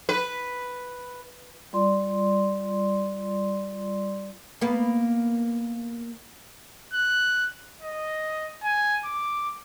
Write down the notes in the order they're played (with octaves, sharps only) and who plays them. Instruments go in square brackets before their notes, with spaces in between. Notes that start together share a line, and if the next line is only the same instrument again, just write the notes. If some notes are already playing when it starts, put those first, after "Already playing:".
[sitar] B4
[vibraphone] G3 F4 D5 C6
[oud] A#3 B3
[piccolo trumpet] F#6
D#5
G#5
D6